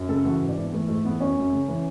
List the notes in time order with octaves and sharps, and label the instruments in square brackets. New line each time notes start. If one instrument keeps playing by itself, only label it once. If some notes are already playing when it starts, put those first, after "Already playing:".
Already playing: [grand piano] F#2
C#3 A4
E3 F#4
G#2 F#4
D4
E3 B3
E3 A3
G#2 A3
E3 B3
F#2 C#4
F#2
C#3
E3